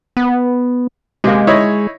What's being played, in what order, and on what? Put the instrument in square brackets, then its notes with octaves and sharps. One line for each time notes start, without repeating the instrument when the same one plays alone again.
[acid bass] B3
[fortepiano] C3 A#3 [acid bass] G#3
[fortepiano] D#4 E4 C#5